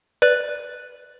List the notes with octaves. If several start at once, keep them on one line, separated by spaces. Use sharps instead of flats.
B4 D5 F#6